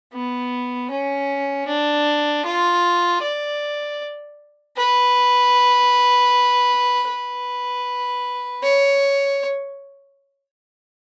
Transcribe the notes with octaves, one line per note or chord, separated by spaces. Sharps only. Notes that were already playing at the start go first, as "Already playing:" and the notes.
B3
C#4
D4
F4
D5
B4
B4
C#5